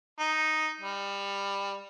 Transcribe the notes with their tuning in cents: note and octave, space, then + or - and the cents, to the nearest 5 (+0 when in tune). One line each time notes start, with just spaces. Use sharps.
D#4 +0
G3 +20